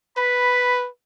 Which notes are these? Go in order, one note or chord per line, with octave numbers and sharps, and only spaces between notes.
B4 B5